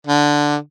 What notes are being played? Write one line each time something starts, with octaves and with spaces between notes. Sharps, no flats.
D3